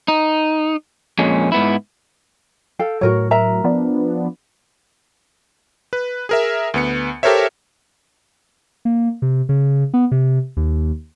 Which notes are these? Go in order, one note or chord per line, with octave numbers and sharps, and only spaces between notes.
D#4
F2 A#2 G#3 C#4
G#2 B3 E4
A4 F5 G5
A2 F#3 F#4 A#4 C#5
A#4 E5 A#5
F3 B3 D4
B4
G#4 A#4 E5
D2 B3 C#7
G4 A4 A#4 C5 C#5 E5
A#3
C3
C#3
B3
C3
D#2